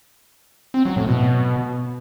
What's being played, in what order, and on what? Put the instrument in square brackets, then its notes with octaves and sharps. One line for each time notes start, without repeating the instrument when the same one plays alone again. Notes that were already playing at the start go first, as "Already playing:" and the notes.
[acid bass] C4
F#3
A2
B2